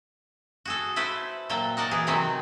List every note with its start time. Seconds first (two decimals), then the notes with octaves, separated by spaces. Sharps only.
0.65 F#4 G#4 A4
0.96 A3 E4 B4 C5
1.49 A#2 F#3 A4 G5
1.77 D#4 F#4 A#4 D5
1.91 E3 G#4
2.07 C3 D#3 E3 F#3 A3 C4